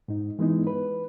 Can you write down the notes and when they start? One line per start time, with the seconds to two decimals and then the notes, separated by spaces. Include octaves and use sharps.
0.08 G#2 D#4
0.39 E3 G#3 B3 D#4 E4
0.67 B4